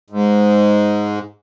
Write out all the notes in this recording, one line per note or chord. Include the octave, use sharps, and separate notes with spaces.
G#2